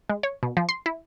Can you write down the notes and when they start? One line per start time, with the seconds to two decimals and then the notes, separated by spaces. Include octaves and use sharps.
0.10 G#3
0.23 C#5
0.43 B2
0.57 F3
0.69 C6
0.86 E4